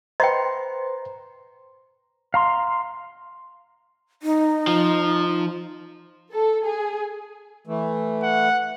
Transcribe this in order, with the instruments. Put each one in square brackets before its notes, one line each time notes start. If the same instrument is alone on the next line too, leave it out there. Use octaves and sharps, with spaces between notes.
[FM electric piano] B4 C5 [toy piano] D#5 G5 [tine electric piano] A#5 C6
[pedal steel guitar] F5 A#5 C6
[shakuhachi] D#4
[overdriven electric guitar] F3
[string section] A4
G#4
[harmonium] E3 A3
[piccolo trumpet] F#5